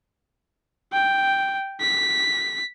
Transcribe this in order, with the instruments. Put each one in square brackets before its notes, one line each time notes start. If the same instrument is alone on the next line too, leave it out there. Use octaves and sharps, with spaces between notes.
[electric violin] G5
B6